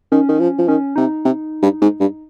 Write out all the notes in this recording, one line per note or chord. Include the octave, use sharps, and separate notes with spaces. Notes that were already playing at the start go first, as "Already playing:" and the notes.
D#3 C#4
D#3
F3
F3
D#3 C#4
C3 D#4
C3
G2
G#2
G2